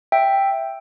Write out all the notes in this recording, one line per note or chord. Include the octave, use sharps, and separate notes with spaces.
E5 G5